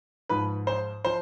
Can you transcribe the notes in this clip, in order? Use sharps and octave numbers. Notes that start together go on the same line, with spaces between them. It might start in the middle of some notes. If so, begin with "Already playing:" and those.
G#2 F3 B4
C5
F3 C5